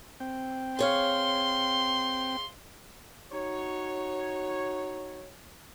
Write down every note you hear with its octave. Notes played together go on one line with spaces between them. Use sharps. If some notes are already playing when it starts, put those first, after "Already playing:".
C4 G5
G#4 C#5 F5 C6
D#4 F#4 C#5